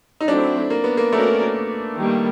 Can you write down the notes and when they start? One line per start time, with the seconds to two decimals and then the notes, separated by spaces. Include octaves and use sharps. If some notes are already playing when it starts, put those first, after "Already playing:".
0.21 D#4
0.28 F#3 A3 C4 D4 E4
0.70 A#3
0.84 B3
0.97 A#3
1.12 A3 C#4 F#4 A#4 D5
1.96 D#3 G3 A#3